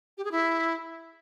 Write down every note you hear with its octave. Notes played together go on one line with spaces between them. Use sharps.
G4
G#4
E4